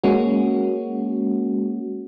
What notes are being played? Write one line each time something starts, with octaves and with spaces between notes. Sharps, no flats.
G#3 A#3 C#4 F#4